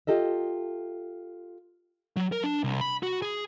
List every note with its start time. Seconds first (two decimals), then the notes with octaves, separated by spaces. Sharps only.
0.07 F4 G4 A4 D#5 E5
2.17 F#3
2.32 A#4
2.44 D4
2.64 C2
2.81 B5
3.03 F#4
3.22 G#4